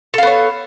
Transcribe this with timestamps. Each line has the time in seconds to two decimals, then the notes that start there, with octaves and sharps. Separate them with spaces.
0.14 A4
0.18 F5
0.23 B3
0.27 C#5